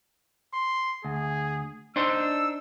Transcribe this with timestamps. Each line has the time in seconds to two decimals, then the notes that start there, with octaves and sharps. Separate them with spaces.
0.54 C6
1.05 D2 G#4
1.96 D4 D#4 C5 E6